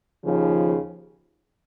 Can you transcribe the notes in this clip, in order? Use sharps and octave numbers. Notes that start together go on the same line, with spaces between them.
D#2 C#3 F3